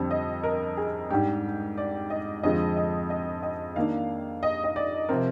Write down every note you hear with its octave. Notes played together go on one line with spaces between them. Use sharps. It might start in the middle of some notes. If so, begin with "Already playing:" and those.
Already playing: F2 D3 G3 C4
D#5
A#4
G#4
G#2 G3 D4 G4
D5
D#5
F2 D3 F3 G#3 D#5
D#5
D#5
D#5
D#3 A#3 D4 F5
D#5
D#5
D5
C3 F3 C4 A#4